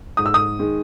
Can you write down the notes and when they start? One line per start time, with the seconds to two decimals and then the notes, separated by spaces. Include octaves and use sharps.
0.17 G#2 D#6
0.26 E6
0.34 D#6
0.59 D#3 G#3